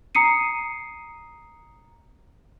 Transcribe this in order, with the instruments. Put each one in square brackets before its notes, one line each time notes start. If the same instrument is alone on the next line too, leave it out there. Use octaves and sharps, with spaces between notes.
[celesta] A#5 D#6 C7 C#7 D#7